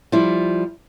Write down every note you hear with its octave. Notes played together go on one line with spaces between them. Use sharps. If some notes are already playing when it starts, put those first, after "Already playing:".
F3 G3 E4